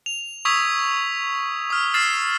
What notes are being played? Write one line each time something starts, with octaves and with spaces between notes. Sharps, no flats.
F7
C#6 D#6 E6 G#6 B6 F7
D#6 F6
E6 F6 A6 C7 E7